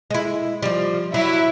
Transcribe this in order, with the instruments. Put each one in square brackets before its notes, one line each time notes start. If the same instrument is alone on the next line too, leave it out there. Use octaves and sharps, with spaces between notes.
[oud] G#3 E4
F3 G3
[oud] F#3 [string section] E4